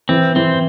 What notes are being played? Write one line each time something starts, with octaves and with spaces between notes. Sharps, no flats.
E3 C4
E3 C4